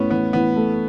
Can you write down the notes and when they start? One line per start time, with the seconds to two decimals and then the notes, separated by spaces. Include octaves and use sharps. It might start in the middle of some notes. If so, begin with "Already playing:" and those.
Already playing: A2 B3 C#4
0.10 E3 B3
0.33 E3 B3
0.56 A3